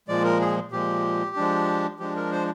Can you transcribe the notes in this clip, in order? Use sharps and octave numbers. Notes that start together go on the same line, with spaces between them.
A#2 F3 G#3 D5
A#4
G#4
A#2 F3 G#3 G4
F3 G#3 D4
F3 G#3 D4 G4
A#4
C5